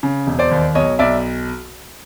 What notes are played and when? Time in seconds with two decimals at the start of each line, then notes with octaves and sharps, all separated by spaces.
0.03 C#3
0.27 E1
0.39 C5 D5
0.51 D#2
0.75 B1 C#5 D#5
0.99 B1 D5 E5